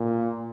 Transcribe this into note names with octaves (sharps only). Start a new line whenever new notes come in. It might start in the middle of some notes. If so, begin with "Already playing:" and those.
Already playing: A#2